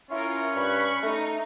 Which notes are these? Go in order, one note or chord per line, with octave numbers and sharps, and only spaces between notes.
C#4 E4 F4 A#4
G2 B5 C#6 F#6
A3 D#4